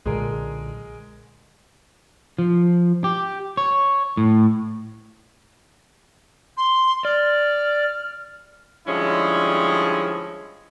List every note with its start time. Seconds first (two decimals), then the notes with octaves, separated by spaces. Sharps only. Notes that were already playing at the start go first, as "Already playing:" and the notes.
0.05 B1 A#2 D3 G#3 G#4 A#4
2.39 F3
3.04 G4
3.57 C#5
4.17 A2
6.57 C6
7.05 D5 F6
8.87 D3 F3 G3 G#3 C#4 E4